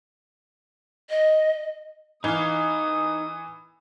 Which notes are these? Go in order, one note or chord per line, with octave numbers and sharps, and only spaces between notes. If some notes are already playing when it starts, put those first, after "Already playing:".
D#5
E3 D#4 F5 D#6